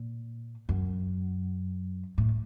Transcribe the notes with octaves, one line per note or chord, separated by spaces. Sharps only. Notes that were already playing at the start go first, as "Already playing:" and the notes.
Already playing: A#2
F#2
A2